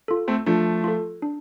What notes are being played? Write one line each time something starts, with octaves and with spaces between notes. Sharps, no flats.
F4 A4
A3 C4
F3 A3 D4
F4 A4
D4